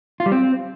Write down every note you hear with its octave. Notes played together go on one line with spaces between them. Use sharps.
F4
G3
C4